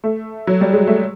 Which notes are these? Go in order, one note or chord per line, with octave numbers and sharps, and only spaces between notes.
A3
F#3
G3
G#3
A3